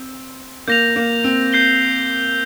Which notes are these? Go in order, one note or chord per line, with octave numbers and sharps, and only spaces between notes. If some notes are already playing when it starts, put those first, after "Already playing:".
Already playing: C4
A#3 G6 A#6 F7
A#3
C4
G6 C7 G7